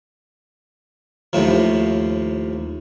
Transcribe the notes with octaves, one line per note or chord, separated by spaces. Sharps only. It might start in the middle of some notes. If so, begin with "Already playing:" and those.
D#2 A2 F3